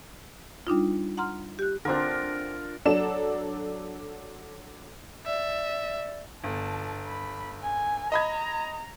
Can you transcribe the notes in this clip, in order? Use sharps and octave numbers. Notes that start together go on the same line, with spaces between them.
G3 D4 D#4 F4
F#5 A#5 C6 F6
G4 F#6
D3 C4 D4 F4 A#4
F#3 D4 A4 E7
D5 E5
G1 A5
B5
G#5
D#5 A#5 B5 G#6